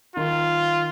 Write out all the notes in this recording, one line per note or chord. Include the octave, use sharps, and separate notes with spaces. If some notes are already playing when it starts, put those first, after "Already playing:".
D#3 F4